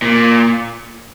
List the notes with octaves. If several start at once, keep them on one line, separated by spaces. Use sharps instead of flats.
A#2